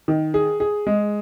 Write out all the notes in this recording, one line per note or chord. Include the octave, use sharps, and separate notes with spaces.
D#3
G#4
G#4
G#3